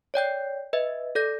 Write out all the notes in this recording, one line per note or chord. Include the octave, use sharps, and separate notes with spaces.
C#5 D5 G5 G6
B4 D#5 E5
A4 D5 G6 A#6